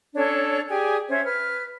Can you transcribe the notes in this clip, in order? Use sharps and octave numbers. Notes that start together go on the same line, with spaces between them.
C#4 D4 A4 C#5
G4 G#4 D5 G#5
C#4 C5 E5
B4 F6